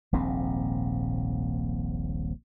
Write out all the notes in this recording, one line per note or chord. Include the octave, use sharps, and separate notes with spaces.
D#1 A#1 G#2 C4